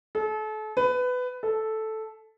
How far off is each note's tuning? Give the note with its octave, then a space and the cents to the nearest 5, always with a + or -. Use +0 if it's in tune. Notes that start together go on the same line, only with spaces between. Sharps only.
A4 -35
B4 +20
A4 -5